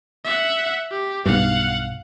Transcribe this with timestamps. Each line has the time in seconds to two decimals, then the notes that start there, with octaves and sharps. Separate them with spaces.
0.25 E5 F#5
0.91 G4
1.26 B1 G2 F5 F#5